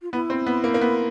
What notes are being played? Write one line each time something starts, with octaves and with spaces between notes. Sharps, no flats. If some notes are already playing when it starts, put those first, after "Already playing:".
F4
B3 E4
C4
B3
A#3
A#3
B3